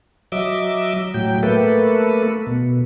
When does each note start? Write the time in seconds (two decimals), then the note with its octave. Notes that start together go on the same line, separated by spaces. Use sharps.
0.32 F#3 D#5 E5 D6
1.14 A2 F#3 G5
1.43 A3 A#3 A4 B4
2.47 B2